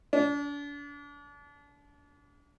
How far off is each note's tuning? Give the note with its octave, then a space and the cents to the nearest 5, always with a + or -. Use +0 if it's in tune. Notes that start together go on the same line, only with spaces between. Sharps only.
D4 -35